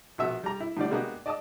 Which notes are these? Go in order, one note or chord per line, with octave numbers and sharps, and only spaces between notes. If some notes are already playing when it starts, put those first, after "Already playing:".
A#1 B2 B3 E5 E6
G3 A#5
E4
A2 D3 G3 D5
G#3 A#3 B3 D4 F#4 G4
D5 D#5 A5 D6 D#6